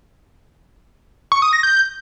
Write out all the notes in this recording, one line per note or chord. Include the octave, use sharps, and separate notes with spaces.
C#6
D#6
A#6
G6